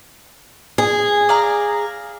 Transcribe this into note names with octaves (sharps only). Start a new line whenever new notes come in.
G#4
D5 F5 A#5